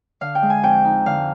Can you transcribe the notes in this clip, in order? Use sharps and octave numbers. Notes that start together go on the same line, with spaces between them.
D3 F5
G5
G#3
G#5
F2 G5
D#4
D3 F5